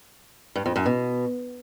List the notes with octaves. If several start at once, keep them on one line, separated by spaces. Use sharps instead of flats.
G2
F2
F#2
B2